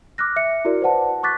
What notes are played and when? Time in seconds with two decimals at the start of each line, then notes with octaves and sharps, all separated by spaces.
0.18 D6 F6 F#6 A#6
0.36 E5 C#7
0.65 E4 F#4 A#4 D5
0.81 B4 C5 D5 F#5 A5
1.23 C#6 D6 F#6 A6 B6